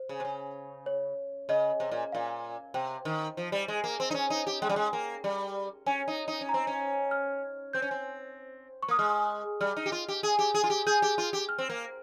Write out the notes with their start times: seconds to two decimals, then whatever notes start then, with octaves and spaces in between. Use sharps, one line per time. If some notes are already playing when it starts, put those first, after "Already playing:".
Already playing: C5
0.09 C#3
0.20 C3
0.25 C#3
0.86 C#5
1.49 C#3 D#5
1.80 C3
1.92 A#2
2.12 A#2 F5
2.74 C3 G5
3.05 D#3
3.37 F3
3.52 G3
3.68 G#3
3.84 A#3
4.00 C4
4.11 D#4
4.14 C#4
4.30 D#4
4.47 G4
4.62 G#3 G5
4.69 G3
4.76 G#3
4.93 A#3
5.24 G3
5.86 C#4 G#5
6.08 D#4
6.28 D#4
6.41 C#4
6.49 A#5
6.54 C4
6.67 C#4
7.11 F6
7.73 C4 G6
7.82 C#4
7.91 C4
8.83 C#6
8.88 A#3 D#6
8.99 G#3 F6
9.61 G3 F6
9.77 D#4
9.86 G4
9.92 F4
10.09 G4
10.23 G#4
10.39 G4
10.54 G#4
10.64 F4
10.70 G4
10.87 G#4 G6
11.02 G4
11.18 F4
11.33 G4
11.49 F6
11.58 C4
11.70 A#3